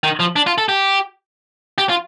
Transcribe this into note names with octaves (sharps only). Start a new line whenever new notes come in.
D#3
F3
D4
F4
A4
G4
G4
F4